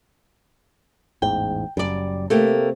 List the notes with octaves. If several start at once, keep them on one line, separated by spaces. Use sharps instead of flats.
A1 E2 G#2 G5
F#1 F#2 G3 D5
C3 A3 A#3 G4